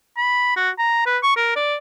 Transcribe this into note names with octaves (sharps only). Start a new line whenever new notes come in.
B5
F#4
A#5
B4
C#6
A#4
D5